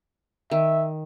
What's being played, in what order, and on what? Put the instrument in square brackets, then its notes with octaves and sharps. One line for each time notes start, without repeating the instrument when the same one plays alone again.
[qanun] D#3 [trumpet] E5